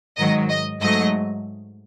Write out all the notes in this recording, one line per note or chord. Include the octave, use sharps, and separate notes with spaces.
G#2 D#3 F#3 D#5
D#5
G#2 F#3 A3 D#5